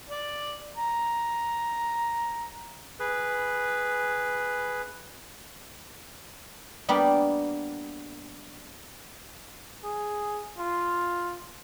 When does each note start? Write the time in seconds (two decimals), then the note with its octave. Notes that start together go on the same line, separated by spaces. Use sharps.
0.10 D5
0.77 A#5
3.00 G#4 B4
6.88 G3 A#3 B3 D4 G4 D5
9.84 G#4
10.58 F4